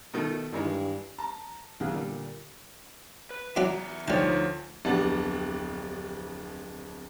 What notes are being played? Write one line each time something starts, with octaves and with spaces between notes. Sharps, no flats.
B2 D#3 A3
G2 D#3 E3 G#3
A5 A#5
B1 B2 E3 G#4 F#5
A#2 D3 G3 A#3
B4
E2 F#3 D4 E4 E5 A#5
D2 F3 G3 D#4 C#5 F#5 A5
D1 F2 B3 D4 G4 A6